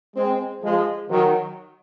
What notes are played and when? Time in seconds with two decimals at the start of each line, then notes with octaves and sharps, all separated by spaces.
0.16 G#3 C4
0.63 F3 G#3
1.09 D#3 F#3